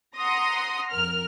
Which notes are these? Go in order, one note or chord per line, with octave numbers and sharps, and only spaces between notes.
F#5 A#5 C6 D#6 A#6
F2 A#4 F6